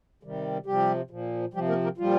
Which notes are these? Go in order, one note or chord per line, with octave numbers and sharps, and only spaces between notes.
C3 D#3 G3
C3 F3 G3 G4
A#2 F3
C3 F3 G3 G4
A#3 A#4
A#3 A#4
A#2 F3 G3 F4